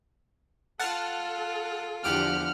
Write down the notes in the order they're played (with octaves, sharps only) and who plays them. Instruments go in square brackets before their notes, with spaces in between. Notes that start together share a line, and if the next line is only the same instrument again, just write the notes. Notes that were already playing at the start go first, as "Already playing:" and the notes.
[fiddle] F4 [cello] A4 [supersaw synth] F#5 A5 F6
[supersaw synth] E2 G4 D7 [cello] D3 F3 [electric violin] F#5 F6